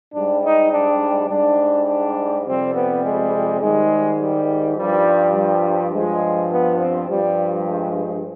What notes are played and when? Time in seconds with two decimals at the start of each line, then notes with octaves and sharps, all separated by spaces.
0.13 G#2 G3 D4
0.43 D#4
0.72 D4
1.29 G#2 G3 D4
1.87 D4
2.45 F2 C3 G3 C4
2.74 B3
3.03 G#3
3.60 G#2 D#3 G3 G#3
4.20 G3
4.77 G2 F3 G3
5.34 G3
5.93 G2 F3 G#3
6.50 B3
6.80 C4
7.08 G2 F3 G3
7.66 G#3